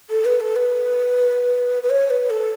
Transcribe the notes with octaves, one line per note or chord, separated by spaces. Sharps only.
A4
B4
A4
B4
B4
C#5
B4
A4